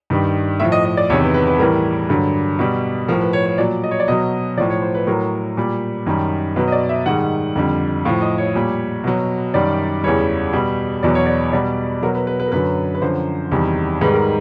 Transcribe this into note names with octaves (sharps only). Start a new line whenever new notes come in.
G2 D#3 G3
A2 F3 E5
D#5
D#5
D5
E2 C3 D#3 C#5
B4
B4
B4
A2 E3 G3 A#4
G2 D3 F#3
B2 G3
A2 F3 A#4
B4
C#5
C#5
A#2 F#3 D5
D#5
C#5
D5
B2 F#3 D#5
A2 F3 D5
C#5
C5
B4
A2 F#3 A#4
A#2 G3
F#2 D#3 G3
B2 F#3 B4
D#5
D5
E5
G#2 D#3 G3 F#5
F2 D3 G3
A2 F3 F5
D#5
C#5
A#2 G3
B2 F#3
F#2 D#3 G3 D5
E2 C#3 E3 G3 C#5
B2 G3
E2 B2 F#3 D5
C#5
D5
B2 G3 D5
B2 F#3 A#4
B4
B4
B4
A#4
F#2 D3 F#3 B4
B4
F#2 D3 F3 C5
E2 C3 D#3 G3
G#2 D#3 G3 B4
A#4